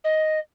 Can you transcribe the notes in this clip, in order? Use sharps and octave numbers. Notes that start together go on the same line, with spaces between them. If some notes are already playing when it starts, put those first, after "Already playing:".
D#5